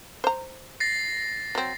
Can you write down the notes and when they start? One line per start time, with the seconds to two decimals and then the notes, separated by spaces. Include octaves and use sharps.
0.24 C5 A#5
0.80 A6 A#6 C7
1.55 F#3 C4